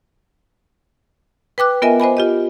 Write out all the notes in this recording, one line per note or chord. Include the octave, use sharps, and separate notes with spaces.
B4 G5 D6 F#6
B3 F4 A#4 D#5 E5 G#5
C5 D#5 G#5 B5
F4 G4 D#5